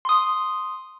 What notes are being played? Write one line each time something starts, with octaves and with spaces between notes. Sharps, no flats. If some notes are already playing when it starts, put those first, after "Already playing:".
C6 D#6